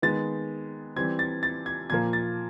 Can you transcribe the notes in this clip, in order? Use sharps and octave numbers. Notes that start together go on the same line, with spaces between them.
D#3 G#3 B3 A6
E3 G3 C4 G#6
A6
A6
G#6
A#2 F3 A#3 G#6
A6